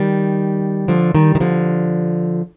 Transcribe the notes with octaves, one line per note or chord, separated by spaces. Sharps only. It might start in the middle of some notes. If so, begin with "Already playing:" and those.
Already playing: D#3 G3
D3 F3
D#3 G3
D#3
D3 F3